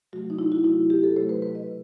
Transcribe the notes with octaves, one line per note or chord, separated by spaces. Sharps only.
C3 F#3 A3 F#4
D#4
E4
F#4
C3 F#3 A3 E4
G4
A4
C3 F#3 A3 C5
B4
B4
D#5
C3